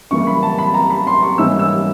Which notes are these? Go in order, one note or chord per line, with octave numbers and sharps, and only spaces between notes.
F#2 C#3 E3 G3 A#3 C#6
B5
A5
B5
A#5
B5
C6
C#6
G#2 E3 G3 A#3 C#4 E6
E6